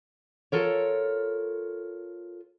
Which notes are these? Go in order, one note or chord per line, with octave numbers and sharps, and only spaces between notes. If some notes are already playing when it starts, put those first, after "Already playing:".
F4 A4 A#4 C#5